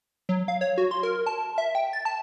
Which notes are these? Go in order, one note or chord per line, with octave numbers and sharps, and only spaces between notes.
F#3
F5
C#5
F#4
C6
A#4
A5
E5
G5
A6
A5